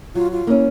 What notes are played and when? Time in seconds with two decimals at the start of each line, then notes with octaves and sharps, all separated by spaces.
0.15 F#3 F4
0.31 F4
0.47 A#3 C#4 E4